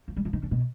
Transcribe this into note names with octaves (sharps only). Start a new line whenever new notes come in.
F3
G3
F3
D#3
D3
B2